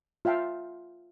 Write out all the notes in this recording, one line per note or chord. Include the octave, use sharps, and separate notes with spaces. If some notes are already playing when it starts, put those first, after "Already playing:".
F4 E5 F5 G5 A5